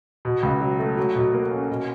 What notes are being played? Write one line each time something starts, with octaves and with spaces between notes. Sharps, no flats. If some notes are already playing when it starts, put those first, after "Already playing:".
B2
C#2
F#3
A3
F#3
B2
A#3
C#4
B2